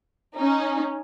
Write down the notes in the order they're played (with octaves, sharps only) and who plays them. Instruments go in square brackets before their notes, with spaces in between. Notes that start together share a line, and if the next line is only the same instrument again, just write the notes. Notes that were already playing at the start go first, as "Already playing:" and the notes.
[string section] C#4 D#4